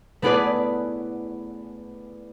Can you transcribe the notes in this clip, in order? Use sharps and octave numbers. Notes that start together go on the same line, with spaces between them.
A3 B3 E4 G#4 B4 D5